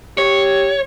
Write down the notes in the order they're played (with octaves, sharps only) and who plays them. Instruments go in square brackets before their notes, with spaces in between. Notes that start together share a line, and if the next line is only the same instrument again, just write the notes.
[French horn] G4 [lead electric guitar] C#5